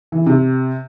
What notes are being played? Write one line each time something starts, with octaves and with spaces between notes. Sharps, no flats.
E3
C3